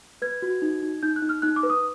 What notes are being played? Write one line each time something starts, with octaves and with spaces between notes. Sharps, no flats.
B4 G#6
F#4
D#4
D#4
D#4 G6
F#6
D#4
F6
D#4 F#6
D6
B4
D#6